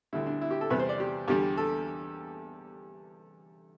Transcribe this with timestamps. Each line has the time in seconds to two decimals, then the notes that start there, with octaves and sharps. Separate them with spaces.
0.13 D2 D3 G3 E4
0.26 D4
0.41 E4
0.51 G4
0.61 A4
0.70 E2 C3 G3 B4
0.79 C5
0.89 D5
1.00 G4
1.28 E2 D3 G3 G4
1.57 A4